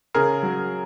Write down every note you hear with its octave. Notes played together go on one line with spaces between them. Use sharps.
C#3 G#4 A#4
F#3